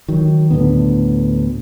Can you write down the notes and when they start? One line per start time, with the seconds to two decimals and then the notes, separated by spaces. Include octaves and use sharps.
0.08 D#3 F#3
0.51 D2 A2 D3 B3